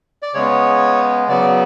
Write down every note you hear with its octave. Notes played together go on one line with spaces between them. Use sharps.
D5
C#3 G#3 B3 C#5
C#3 F#3 B3 D5